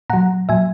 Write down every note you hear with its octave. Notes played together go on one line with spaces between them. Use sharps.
A#2 F#3 F#5 A#5
A#2 F#3 E5 G#5